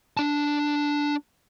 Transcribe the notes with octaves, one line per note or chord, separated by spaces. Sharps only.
D4 A5